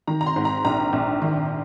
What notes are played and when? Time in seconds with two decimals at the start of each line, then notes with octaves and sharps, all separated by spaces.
0.07 D#3 A#5
0.21 A#5
0.26 C6
0.36 G#2
0.45 A#5
0.65 A#1 A#5
0.93 A#1
1.22 D#3